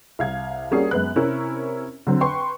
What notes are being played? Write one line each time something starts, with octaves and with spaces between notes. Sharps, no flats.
C2 F5 G#6
G3 A#3 C#4 D4 F#4 G#4
F#2 G#3 B3 B4 F#6
C3 C#4 E4 A#4
D3 F#3 C4
B4 G5 C6 C#6